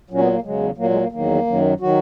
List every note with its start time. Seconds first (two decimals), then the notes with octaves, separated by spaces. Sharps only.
0.10 A#2 F#3 C#4
0.21 B3
0.32 A#3
0.43 E2 C#3 F#3 G#3
0.77 A#2 F#3 A#3
0.90 G#3
1.00 A#3
1.12 E2 D#3 F#3 A#3
1.46 F#2 D#3 F#3
1.80 D#3 F#3 F#4